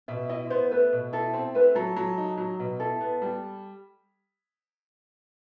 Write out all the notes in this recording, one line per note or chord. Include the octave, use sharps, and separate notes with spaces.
B2 E5
E4 D#5
B3 C5
A3 B4
B2
E4 A4
C4
A3 B4
F#3 A4
F#3
D#4
F#3
B2
E4 A4
B3
G3